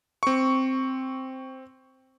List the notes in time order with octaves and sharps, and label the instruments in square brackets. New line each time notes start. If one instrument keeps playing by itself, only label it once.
[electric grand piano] C4 C#6